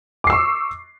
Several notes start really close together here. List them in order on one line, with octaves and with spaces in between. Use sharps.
D6 C7 E6 C#6